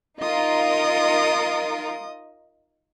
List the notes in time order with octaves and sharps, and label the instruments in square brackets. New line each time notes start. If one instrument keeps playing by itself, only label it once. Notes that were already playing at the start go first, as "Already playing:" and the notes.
[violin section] D#4 F4 A#4 [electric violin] D#5 D#6